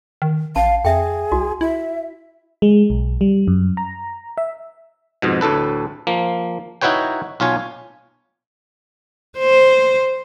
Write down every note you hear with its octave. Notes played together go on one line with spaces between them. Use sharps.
D#3
A1 F5 A5
F2 G#4 E5 G5
C2 F#4
E4 E5
G#3
B1
G3
F#2
A#5
E5
F2 G#2 B2
D2 A2 A4 B4
F3 A#3
D#4 E4 F#4 B4 C#5 G5
B1 F4 C#5 G#5
C5